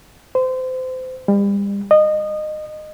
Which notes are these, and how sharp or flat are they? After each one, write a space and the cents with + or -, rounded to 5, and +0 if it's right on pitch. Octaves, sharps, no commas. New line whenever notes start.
C5 -30
G3 +35
D#5 -20